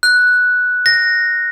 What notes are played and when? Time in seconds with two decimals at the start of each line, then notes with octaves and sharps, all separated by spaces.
0.03 F#6
0.86 A#6